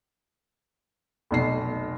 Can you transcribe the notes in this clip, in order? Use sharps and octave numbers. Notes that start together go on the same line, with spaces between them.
F1 B1 C7